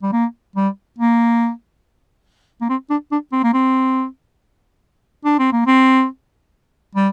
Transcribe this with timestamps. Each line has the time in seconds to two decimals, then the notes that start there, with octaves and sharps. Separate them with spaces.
0.03 G3
0.12 A#3
0.55 G3
0.98 A#3
2.61 A#3
2.69 C4
2.90 D4
3.11 D4
3.32 C4
3.44 A#3
3.53 C4
5.25 D4
5.39 C4
5.52 A#3
5.66 C4
6.95 G3